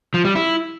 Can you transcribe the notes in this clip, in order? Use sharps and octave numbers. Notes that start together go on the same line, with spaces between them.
F3
G3
E4